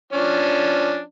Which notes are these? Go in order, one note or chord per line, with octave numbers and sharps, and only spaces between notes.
F3 C#4 D4